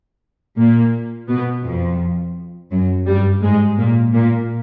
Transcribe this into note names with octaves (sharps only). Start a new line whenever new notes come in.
A#2 A#3
B2 B3
F2 F3
F#2 F#3
G2 G3
G#2 G#3
A#2 A#3
A#2 A#3